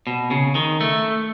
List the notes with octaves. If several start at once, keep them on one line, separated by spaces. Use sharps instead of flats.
B2
C#3
D#3
A3